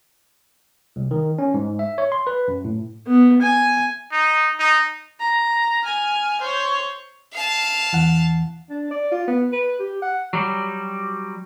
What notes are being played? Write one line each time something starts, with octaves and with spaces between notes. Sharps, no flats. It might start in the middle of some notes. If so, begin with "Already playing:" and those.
C2
D#3
C#4
G#2
E5
C#5
C6
B4
F#2
A2
B3
G#5
D#4
D#4
A#5
G#5 F6
C5 C#5
F5 A5
E2 E3 F#5
D4
D5
F4
B3
B4
G4
F#5
F#3 G3